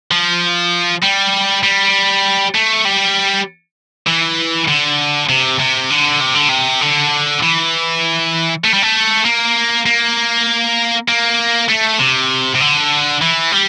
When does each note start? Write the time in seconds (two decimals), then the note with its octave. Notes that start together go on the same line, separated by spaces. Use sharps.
0.11 F3
1.03 G3
1.64 G3
2.55 A3
2.85 G3
4.07 E3
4.69 D3
5.29 C3
5.59 C3
5.90 D3
6.21 C3
6.35 D3
6.49 C3
6.82 D3
7.43 E3
8.64 A3
8.74 G3
8.82 A3
9.25 A#3
9.86 A#3
11.09 A#3
11.69 A3
11.99 C3
12.55 C3
12.60 D3
13.22 E3
13.52 G3